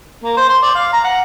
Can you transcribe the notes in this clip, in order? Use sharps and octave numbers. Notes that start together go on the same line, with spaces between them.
A#3
C5
C6
D5
F5
A#5
F#5